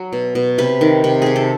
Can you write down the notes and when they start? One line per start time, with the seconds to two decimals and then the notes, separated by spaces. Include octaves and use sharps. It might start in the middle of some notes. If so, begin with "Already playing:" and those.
Already playing: F#3
0.13 B2
0.35 B2
0.58 C3 B4
0.81 D#3
1.04 C3
1.22 C3 G#4
1.36 A4